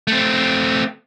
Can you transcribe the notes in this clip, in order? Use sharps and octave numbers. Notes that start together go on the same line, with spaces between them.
A3 C4